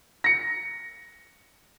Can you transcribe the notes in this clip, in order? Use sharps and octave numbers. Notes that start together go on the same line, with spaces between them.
A#6 C#7